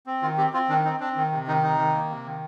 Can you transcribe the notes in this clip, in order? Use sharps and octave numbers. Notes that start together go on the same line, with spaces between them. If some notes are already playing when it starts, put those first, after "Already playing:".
C4
D#3 F4
C4 G4
C4 F4
D#3 D4
C4 D#4
C4 D4
D#3
C3
D#3 D#4
C3 D#4
D#3
A#3
C3
D#3